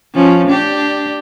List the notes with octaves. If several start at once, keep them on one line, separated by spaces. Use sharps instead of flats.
F3 C#4
D4 G4